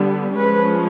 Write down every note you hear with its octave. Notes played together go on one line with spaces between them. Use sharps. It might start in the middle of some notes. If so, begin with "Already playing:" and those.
Already playing: D3 G3 B3
F3 G#3 C#4 B4